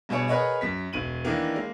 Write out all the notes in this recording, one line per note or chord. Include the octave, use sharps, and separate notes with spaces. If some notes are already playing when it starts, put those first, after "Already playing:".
G2 B2 G#4 C#5 C#7
G#4 A#4 B4 C#5 D#5 F#5
F#2 B6
E1 D#7 F#7
D#3 E3 A#3 D4
G#3 A#3